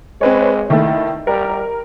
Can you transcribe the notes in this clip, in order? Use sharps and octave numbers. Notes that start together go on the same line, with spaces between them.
G#3 C4 B4 C#5
D#3 A3 E4
G3 A#4